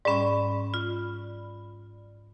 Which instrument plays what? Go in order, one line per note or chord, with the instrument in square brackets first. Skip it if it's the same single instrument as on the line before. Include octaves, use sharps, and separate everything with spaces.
[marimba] G#2 G3 C#4 [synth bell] D5 B5
[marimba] F4